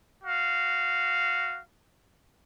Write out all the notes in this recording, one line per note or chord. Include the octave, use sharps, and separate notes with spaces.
F#4 F5